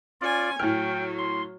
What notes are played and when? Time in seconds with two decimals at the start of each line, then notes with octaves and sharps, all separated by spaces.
0.21 C#4 F4 D5 G#5
0.59 A2 F#3 G5 F6
1.19 C6